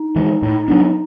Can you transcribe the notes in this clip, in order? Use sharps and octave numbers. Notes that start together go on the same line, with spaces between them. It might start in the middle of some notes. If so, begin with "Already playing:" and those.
Already playing: D#4
E3 G#3
A2
F#3 B3 D4